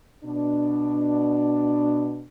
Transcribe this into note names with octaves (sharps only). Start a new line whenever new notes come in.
B2 D4